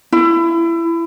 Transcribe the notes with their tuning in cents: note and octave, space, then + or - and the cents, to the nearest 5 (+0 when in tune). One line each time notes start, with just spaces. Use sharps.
E4 +25